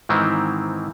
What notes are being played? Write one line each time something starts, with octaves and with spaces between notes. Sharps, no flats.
G#2 D#3 E3 C4 E4